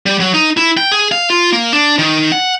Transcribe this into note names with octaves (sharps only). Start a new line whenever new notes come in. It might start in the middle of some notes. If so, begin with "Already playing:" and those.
G3
F#3
D#4
E4
G5
G#4
F5
F4
A#3
D4
D#3
F#5